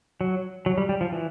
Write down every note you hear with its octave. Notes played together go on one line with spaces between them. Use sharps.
F#3
F#3
G3
G3
F3
E3